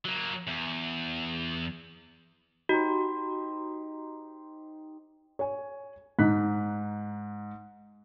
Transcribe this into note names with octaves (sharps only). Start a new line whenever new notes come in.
F#3 A#3
E2
D#4 F#4 G4 C5
C#5 G#5
G#2 D#4 F#6 B6